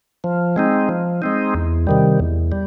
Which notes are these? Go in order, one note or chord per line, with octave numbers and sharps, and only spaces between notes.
F3
G#3 C4 D#4
F3
G#3 C4 D#4
E2
C3 D#3 G3
E2
G3